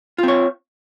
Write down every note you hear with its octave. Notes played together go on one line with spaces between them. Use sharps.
C4 F4 C#5